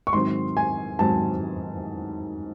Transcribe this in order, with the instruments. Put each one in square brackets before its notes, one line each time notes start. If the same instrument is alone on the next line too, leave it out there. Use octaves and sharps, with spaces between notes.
[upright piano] C#6
G#2 D#3 F#3 C4 C6
G#5
G#2 D#3 F#3 C4 A5